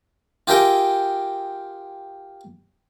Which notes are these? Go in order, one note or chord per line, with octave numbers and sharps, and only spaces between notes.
F4 G4 G#4 A#4 E5 G5